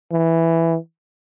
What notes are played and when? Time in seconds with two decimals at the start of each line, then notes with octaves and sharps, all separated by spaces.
0.12 E3